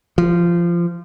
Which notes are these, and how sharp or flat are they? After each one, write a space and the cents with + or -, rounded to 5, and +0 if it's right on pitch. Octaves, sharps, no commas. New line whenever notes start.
F3 -20